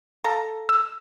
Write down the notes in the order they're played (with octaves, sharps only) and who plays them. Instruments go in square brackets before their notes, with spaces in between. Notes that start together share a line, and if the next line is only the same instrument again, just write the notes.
[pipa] A4 F5 A#5
[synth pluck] E6